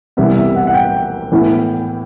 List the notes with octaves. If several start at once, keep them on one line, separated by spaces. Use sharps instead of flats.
C2 C3 E3 G3 B3 E5
E5
F#5
F#5
G5
A2 E3 B3 E4